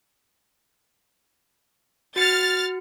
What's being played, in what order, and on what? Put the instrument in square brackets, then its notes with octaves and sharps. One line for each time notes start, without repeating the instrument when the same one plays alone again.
[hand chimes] F#4 C#7 [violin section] F6 A6